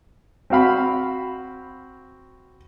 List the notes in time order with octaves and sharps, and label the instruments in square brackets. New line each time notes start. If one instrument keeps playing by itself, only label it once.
[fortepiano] C4 F#4 F5 B5